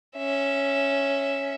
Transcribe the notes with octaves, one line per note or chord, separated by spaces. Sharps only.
C#4 E5